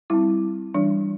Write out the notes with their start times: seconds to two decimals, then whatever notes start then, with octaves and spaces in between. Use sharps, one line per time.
0.10 G3 C4 E4
0.74 E3 G3 D4